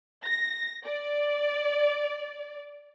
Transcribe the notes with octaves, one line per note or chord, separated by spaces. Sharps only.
A#6
D5